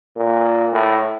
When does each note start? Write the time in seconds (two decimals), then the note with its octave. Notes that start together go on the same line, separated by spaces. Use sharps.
0.17 A#2
0.73 A2